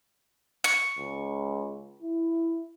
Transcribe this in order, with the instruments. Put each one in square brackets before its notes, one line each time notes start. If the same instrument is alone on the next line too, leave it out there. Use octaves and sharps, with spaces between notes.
[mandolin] C#6
[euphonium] C#2
E4